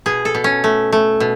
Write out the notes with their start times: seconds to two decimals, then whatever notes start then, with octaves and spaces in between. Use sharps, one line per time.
0.06 B2 G#4
0.25 A4
0.34 B2
0.44 C#4
0.64 A3
0.92 A3
1.20 B2